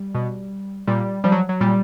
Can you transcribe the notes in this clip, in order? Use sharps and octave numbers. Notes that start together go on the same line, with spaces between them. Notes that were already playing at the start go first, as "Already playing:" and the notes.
Already playing: G3
B2
A#2 G3
F3 G3
F#3
F#3
A#2 G3